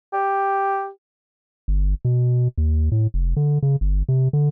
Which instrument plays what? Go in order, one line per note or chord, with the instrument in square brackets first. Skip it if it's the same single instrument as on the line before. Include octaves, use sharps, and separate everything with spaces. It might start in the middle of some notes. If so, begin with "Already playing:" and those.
[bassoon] G4
[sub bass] G1
B2
D#2
A2
F1
D3
C#3
G1
C3
D3